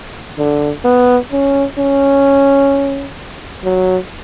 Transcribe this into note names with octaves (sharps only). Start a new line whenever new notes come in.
D3
B3
C#4
C#4
F#3